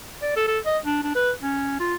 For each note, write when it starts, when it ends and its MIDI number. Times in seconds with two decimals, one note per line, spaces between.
0.22 0.32 74
0.36 0.45 69
0.48 0.59 69
0.65 0.78 75
0.84 1.01 62
1.03 1.13 62
1.15 1.31 71
1.42 1.78 61
1.80 1.95 65